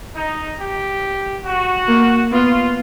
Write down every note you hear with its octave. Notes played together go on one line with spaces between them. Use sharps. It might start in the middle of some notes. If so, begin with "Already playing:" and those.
D#4
G4
F#4
A#3
B3 F4